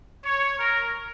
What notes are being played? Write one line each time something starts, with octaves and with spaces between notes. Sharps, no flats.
C#5
A#4